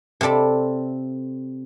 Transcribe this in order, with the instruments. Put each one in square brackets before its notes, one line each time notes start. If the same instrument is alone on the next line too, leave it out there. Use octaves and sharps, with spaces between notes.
[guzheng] C3 C4 A4 D5 B5